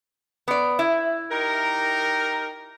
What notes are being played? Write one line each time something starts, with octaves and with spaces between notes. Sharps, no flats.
B3 D5
E4
D#4 G4 A#4